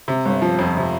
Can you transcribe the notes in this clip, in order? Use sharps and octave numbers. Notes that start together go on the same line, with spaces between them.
C3
G1
F3
F2
C3